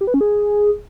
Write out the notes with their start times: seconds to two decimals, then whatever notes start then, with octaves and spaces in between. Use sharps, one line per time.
0.01 G4
0.07 B4
0.14 C#4
0.21 G#4